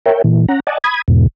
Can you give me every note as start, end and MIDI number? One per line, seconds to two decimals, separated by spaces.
0.06 0.22 70
0.06 0.22 73
0.06 0.22 76
0.06 0.22 79
0.24 0.46 46
0.24 0.46 52
0.48 0.60 61
0.48 0.60 78
0.48 0.60 82
0.67 0.78 74
0.67 0.78 75
0.67 0.78 78
0.67 0.78 80
0.67 0.78 81
0.84 1.02 83
0.84 1.02 87
0.84 1.02 92
1.08 1.27 40
1.08 1.27 44
1.08 1.27 47